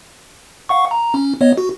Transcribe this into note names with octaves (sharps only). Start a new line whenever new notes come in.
F5 F#5 C#6
A#5
C#4
B3 C#5 D#5
F#4